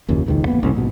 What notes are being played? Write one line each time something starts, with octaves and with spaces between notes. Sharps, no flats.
F#1 D#2 A#2 C#4
E1 C#2 D#3
A1 A#3 B3
F#1 C2 A2 C#4
A#1 G#2 B2